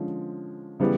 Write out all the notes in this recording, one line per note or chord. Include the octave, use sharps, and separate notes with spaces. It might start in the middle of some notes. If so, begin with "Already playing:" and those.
Already playing: D3 F3 G#3 C#4
C#3 E3 G3 B3